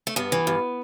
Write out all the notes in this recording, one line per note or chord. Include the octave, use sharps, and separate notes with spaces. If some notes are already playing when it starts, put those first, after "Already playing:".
A3
G2 B3
E3
G2